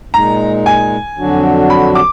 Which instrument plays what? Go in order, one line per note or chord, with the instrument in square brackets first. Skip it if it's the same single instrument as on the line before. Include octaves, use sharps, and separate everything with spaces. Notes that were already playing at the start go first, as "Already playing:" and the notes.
[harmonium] A#2 G#3 D#4 [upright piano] A#5
[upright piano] G#5
[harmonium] F2 D3 F#3 D4 F#4
[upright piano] B5
D6